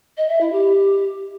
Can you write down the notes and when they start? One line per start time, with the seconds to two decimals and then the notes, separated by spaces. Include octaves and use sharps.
0.17 D#5
0.29 E5
0.41 E4
0.52 G4